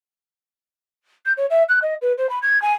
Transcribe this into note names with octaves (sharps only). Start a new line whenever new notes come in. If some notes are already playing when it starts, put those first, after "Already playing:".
G6
C#5
E5
F#6
D#5
B4
C5
B5
G#6
G#5